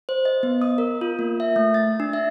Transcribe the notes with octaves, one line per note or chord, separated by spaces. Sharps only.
C5
D#5
B3
D#6
A#4
F4
A#3
E5
A3
A6
D4
E5